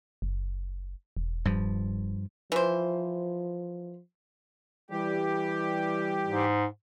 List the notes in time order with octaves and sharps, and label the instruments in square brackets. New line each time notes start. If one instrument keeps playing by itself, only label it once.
[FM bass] F#1
E1
[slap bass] G2 F3
[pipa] E3 C5 [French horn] F3
[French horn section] E3 G3 [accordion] G4
[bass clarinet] G#2